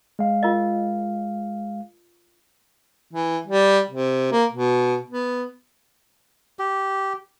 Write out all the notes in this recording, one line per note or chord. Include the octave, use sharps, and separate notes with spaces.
G#3 F5
F4 A#4 D#5
E3
G3
C3
A#3
B2
B3
G4